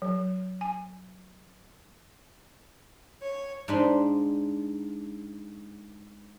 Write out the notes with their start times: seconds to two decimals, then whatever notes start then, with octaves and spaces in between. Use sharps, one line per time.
0.02 F#3
0.61 G#5
3.22 C#5
3.68 G#2 D4 D#5 B5 C6